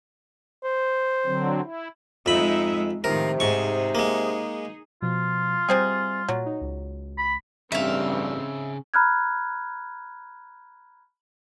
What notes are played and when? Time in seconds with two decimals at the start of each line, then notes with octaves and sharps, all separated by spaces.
0.64 C5
1.25 D3 F#3 C4
1.63 E4
2.26 F2 G#3 D#4 E5 B5
3.04 A2 C3 D#3 F3 A#4
3.40 G#2 D#4 G#4 C#6
3.95 G#3 A#3
5.02 B2 F3 F4
5.69 C3 G3 C4 G#4
6.29 A#2 F#3
6.46 D#4
6.61 C#2
7.18 B5
7.72 A1 G2 C#3 G3 C4 D#4 E5 F5
8.94 A#5 B5 F6 F#6 G#6